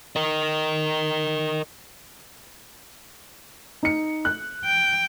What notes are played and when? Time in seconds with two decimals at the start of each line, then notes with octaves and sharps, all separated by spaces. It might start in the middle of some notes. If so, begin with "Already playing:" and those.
0.16 A#4 D#5
3.83 D#4 C#7
4.25 F#6
4.65 G5